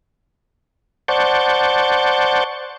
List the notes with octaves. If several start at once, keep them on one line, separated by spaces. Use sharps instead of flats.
C5 D5 F#5 A5 C#6 G6